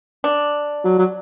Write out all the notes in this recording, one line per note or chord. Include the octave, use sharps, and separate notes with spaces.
D4
F#3
F#3